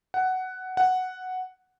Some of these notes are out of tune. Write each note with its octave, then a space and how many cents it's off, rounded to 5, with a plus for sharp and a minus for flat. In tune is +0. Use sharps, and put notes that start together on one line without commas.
F#5 +10
F#5 +0